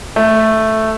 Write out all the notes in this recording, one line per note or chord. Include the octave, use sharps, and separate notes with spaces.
A3